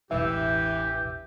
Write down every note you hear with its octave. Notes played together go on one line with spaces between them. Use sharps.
E1 A1 E3 G4 E5 E6